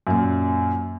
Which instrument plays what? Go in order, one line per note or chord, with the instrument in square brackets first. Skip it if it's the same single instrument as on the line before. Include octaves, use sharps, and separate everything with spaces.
[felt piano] F#2 A#2